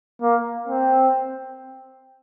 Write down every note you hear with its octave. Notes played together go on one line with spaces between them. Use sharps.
A#3
C4